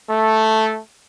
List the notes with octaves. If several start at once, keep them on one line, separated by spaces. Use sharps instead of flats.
A3